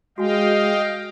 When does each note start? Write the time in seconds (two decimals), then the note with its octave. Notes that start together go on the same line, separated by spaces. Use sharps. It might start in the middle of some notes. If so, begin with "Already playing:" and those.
0.18 G#3 F#4 D#5 F5 G5 G#5